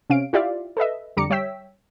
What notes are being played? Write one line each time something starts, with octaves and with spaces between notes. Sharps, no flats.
C3 C#4 F5 D7
E4 F4 G4 D5 E5 F5
A4 B4 D#5 E5
F2 D3 G3 A#5 D6 C#7
G3 C#5 E5 G5 E6 B6